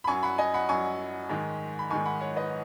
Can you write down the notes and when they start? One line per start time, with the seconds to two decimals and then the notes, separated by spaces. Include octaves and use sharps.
0.04 B5
0.07 F#2 F#3 G#5 C#6
0.23 F#5 B5
0.38 D#5 G#5
0.54 F#5 B5
0.68 F#2 F#3 G#5 C#6
1.29 G#2 D#3 G#3
1.79 B5
1.90 G#2 D#3 G#3 G#5 C#6
2.05 F#5 B5
2.20 C#5 F#5
2.36 B4 D#5